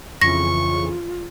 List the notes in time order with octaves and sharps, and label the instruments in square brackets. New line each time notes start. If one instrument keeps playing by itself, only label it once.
[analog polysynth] F2 C#3 E3 [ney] F4 [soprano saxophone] C#6 [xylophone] A#6